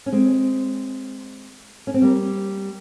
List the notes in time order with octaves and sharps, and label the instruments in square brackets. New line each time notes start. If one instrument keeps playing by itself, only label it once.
[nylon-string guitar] C#4
G#3 C4
C#4
C4
G3 A#3